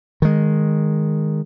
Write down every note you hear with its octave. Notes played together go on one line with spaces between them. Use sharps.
D#3 G#3